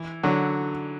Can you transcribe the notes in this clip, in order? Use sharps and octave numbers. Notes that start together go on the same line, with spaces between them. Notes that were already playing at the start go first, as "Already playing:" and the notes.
Already playing: E3
D3 F#3